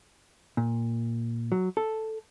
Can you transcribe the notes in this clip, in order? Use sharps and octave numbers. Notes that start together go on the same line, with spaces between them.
A#2
F#3
A4